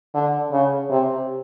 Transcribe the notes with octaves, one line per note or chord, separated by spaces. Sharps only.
D3
C#3
C3